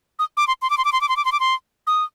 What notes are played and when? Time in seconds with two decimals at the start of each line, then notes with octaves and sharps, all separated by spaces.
0.19 D#6
0.37 D6
0.47 C6
0.62 C6
0.70 D6
0.78 C6
0.85 D6
0.93 C6
1.01 D6
1.09 C6
1.17 D6
1.25 C6
1.32 D6
1.40 C6
1.87 D#6